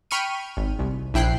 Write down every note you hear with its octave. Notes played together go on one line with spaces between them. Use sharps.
G5 B5 C#6 F6 D#7
G#1
C2
A#1 E4 G5 F#6 C7